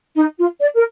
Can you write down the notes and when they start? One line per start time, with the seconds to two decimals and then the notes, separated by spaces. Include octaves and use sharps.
0.16 D#4
0.38 F4
0.60 D5
0.74 A#4